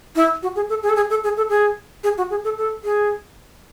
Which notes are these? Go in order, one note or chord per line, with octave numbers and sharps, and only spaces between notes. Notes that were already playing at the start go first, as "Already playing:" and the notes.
E4
F#4
G#4
A4
G#4
A4
G#4
A4
G#4
A4
G#4
G#4
F#4
G#4
A4
A4
G#4